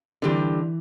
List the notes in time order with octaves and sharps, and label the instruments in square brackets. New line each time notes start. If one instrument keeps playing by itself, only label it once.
[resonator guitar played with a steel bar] D3 G3 C4 G4 [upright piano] E3